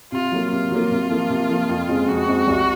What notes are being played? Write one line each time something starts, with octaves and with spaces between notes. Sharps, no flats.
C3 F4
F#3 A#3
C3 F4
F#3 A#3
C3
F3 A#3
C3
F3 A#3
F2
C#3 G#3 C4
F2 F#4
C#3 G#3 C4
C2